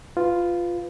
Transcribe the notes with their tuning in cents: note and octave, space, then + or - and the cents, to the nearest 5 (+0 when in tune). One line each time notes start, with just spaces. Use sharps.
F4 +0 B4 +20